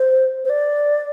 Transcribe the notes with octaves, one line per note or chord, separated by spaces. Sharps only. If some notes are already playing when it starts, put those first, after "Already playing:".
Already playing: C5
C5
D5